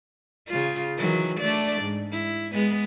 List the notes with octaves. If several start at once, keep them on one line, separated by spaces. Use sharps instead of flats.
C#3 F4
D#3 E3 F#3
A3 D4 D5
G#2
E4
G#3 B3